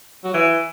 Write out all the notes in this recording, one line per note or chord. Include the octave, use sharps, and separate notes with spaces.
F#3
E3